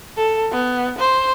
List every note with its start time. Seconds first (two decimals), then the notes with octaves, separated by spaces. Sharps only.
0.17 A4
0.52 B3
0.98 C5